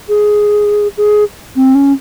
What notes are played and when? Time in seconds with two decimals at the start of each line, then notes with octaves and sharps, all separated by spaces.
0.09 G#4
0.97 G#4
1.56 C4
1.75 C#4